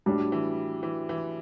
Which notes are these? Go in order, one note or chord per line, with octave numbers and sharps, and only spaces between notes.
A2 F#3 G3 D4
E3
E3
E3